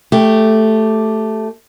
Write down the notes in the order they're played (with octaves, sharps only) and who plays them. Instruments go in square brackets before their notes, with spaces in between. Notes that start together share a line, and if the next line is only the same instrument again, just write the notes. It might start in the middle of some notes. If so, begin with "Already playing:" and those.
[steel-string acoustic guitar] A3 G4